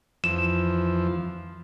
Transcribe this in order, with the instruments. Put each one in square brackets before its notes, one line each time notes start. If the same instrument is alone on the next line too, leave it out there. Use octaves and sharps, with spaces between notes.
[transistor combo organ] F2 E3 F3 [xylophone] E7